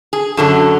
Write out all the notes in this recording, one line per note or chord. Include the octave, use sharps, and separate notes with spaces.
G#4
F#2 D3 F#3 A4